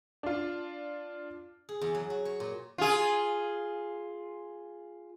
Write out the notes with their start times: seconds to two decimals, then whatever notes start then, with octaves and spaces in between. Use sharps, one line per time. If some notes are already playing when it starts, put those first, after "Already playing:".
0.23 D4 F4
1.69 G#4
1.81 E2
1.95 F#3
2.10 F#4
2.25 C#5
2.40 A#2
2.78 F4 G#4